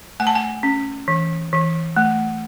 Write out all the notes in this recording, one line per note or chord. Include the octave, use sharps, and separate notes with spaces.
A3 G#5
A5
G#5
C#4
E3
E3
A3